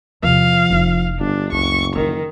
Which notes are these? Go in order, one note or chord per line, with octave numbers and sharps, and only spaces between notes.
E2 C3 F3 F5
F1 E4
G1 D4
F#1 C#2 C#6
D3 D#3 F3